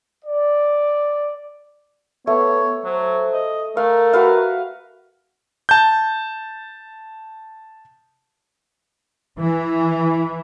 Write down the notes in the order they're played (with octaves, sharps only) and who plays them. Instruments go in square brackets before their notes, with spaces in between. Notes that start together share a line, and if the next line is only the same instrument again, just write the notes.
[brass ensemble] D5
[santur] A3 [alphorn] B3 [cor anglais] C#5
[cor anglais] F#3 [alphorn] C5
[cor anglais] D#5
[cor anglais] A3 [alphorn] A#4 [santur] F5
[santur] F#4 B4 F5
[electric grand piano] A5 G6
[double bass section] E3